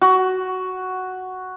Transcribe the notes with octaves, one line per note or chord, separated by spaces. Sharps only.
F#4